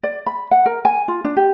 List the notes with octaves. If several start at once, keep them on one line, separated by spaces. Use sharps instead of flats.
D5
B5
F#5
A#4
G#5
F4
D4
G4